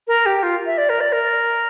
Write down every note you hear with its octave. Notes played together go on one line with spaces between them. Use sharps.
A#4
G4
F4
E5
D5
A#4
D5
A#4